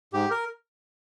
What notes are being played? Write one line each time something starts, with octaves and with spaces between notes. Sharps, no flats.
G#2 G4
A#4